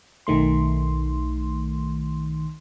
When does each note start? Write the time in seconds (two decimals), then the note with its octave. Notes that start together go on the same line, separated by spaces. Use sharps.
0.27 B1 D#3 A3 C6